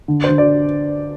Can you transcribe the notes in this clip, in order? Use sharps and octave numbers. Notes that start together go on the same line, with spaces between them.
D3
C5
D3
D5